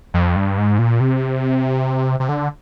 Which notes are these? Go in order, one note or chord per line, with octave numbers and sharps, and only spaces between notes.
F2
G2
G#2
A#2
C3
C3
D3